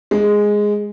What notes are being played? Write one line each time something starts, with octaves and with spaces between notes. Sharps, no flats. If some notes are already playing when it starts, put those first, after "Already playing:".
G#3